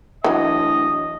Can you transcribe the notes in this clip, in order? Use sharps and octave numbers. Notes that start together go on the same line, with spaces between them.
A2 E3 F#3 D4 D#5 F5